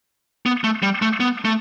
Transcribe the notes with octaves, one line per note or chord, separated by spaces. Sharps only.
B3
A3
G3
A3
B3
A3